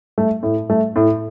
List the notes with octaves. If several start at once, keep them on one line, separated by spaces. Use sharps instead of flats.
A3
A2
A3
A2